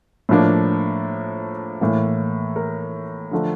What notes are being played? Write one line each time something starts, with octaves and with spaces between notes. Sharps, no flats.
A2 F3 A#3 D4
A2 E3 A#3
A#4
D3 F3 A3 D4